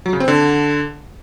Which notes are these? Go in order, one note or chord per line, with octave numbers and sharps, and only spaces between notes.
F#3
C#3
C4
D3